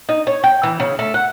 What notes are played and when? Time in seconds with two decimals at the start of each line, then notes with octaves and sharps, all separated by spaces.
0.09 D#4
0.27 C#5
0.44 G5
0.63 E3
0.80 C#3
0.99 A3
1.14 F#5